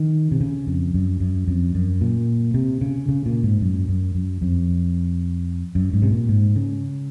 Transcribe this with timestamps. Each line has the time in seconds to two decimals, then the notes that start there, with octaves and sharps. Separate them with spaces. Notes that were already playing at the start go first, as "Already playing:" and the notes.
Already playing: D#3
0.32 C3
0.41 C#3
0.67 F2
0.94 F#2
1.20 F#2
1.48 F2
1.75 F#2
2.01 A#2
2.54 C3
2.81 C#3
3.09 C#3
3.26 A#2
3.43 G#2
3.61 F#2
3.88 F#2
4.15 F#2
4.42 F2
5.75 F#2
5.93 G#2
6.02 C3
6.11 A#2
6.29 G#2
6.56 C#3